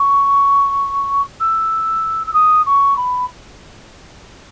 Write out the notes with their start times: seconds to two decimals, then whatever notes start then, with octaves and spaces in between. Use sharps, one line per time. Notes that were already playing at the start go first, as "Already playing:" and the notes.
Already playing: C#6
1.40 E6
2.27 E6
2.33 D#6
2.66 C#6
2.97 B5